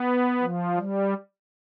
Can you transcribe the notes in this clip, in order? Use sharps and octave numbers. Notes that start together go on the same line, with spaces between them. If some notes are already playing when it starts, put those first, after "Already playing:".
Already playing: B3
F3
G3